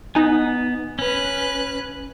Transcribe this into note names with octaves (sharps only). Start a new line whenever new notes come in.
B3 D#4 G#5
C#4 B4 F#6